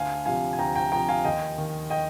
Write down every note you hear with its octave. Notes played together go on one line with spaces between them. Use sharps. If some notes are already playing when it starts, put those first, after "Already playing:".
Already playing: D2 F5 G#5
C3 F3 F5 G#5
G#5
D2 G5 A#5
G5 A#5
C3 F3 G5 A#5
F5 G#5
D#2 D#5 G5
D#3
D#5 G5